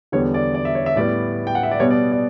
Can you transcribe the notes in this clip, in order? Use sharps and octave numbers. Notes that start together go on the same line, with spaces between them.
E2 D3 G3 B3 C#5
D5
D5
E5
C#5
E5
A2 G3 B3 D5
G5
F#5
E5
D5
B2 G3 B3 C#5
D5
D5